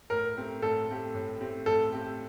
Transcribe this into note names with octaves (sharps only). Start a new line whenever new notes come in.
A2 A#4
A3 C4 G4
A2 A4
A3 C4 G4
A2
A3 C4 G4
A2 A4
A3 C4 G4